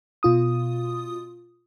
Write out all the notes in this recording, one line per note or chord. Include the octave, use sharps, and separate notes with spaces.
B2 F4 D#6